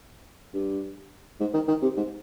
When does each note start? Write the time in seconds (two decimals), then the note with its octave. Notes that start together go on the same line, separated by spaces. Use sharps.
0.54 G2
1.40 G#2
1.53 D#3
1.68 D#3
1.82 C3
1.97 G#2